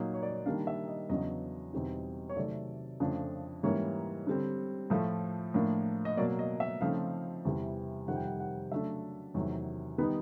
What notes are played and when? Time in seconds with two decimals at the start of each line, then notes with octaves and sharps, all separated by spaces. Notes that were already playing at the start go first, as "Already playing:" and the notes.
Already playing: A#2 F#3 A#3 D#4
0.14 C#5
0.23 D5
0.31 C#5
0.46 D#3 G3 A#3 D4 F5
0.67 E5
0.88 D#5
1.09 E2 C#3 F#3 B3 D4 D#5
1.73 E2 B2 G3 C4 D#4
2.29 C#5
2.36 C3 D#3 F#3 A3 D5
3.00 F2 C#3 F3 A3 D4
3.63 G#2 E3 G3 A#3 C#4 C#5
4.27 D3 G3 C4
4.90 A2 F3 A3
5.54 A2 F3 A#3 D4
6.05 D#5
6.17 B2 F#3 A#3 D5
6.39 D#5
6.60 E5
6.81 C#3 F3 A3 C4 D#4 F5
7.45 E2 C3 E3 G3
8.08 F2 C3 D#3 G3 F#5
8.16 G5
8.24 F#5
8.40 F#5
8.72 C#3 F#3 A3 D4 E5
9.34 E2 C3 D#3 F#3 A3
9.98 D#3 G3 B3 D#4 B4